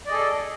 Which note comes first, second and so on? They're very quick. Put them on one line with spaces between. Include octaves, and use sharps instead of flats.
D5 D#5 G#4 A4